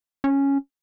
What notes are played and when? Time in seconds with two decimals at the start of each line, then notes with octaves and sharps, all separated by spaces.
0.24 C#4